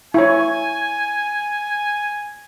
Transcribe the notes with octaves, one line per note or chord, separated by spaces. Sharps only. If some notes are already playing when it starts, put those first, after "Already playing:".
E4 C#5 G#5